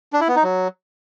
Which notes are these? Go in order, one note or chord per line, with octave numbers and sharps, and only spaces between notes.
D4
E4
B3
D#4
F#3